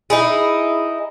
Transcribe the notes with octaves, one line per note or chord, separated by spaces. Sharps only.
D#4 E4 G#4